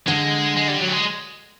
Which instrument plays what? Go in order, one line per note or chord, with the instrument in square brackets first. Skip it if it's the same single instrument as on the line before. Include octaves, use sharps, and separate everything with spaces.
[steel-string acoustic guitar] D3 [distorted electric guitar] G#3
[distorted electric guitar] G#3
G3
F#3
G3
G#3